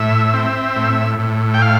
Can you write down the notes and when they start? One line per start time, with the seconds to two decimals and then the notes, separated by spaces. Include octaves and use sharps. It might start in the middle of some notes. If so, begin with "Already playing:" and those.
Already playing: A2 E5
0.34 C4
0.76 A2
1.19 A2
1.54 G5
1.62 F5